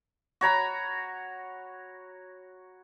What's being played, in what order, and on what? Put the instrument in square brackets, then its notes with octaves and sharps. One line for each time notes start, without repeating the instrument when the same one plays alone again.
[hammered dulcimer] F#4 C#5 A#5 B5